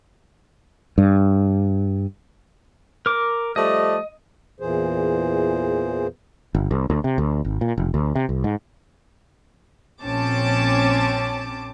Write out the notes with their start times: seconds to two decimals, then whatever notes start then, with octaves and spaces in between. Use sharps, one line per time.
0.98 G2
3.06 A#4 D6
3.56 F3 G3 A3 D#5
4.60 E2 A#2 E3 G#4 C5
6.55 G1
6.71 C2
6.90 D2
7.04 C3
7.18 D2
7.45 G#1
7.61 A#2
7.78 F1
7.94 D2
8.15 C3
8.29 C2
8.44 G#2
10.02 A#1 C4 C#4 A5 D6